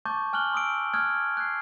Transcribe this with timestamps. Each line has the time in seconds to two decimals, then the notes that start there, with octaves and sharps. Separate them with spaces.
0.06 A5 C#6 D6 G6 A6
0.33 G#5 F6 F#6 F#7 G7
0.53 C6 D#6 E6 D7
0.94 D#6 F6 F#6 G#6
1.37 F#6 G#6 C7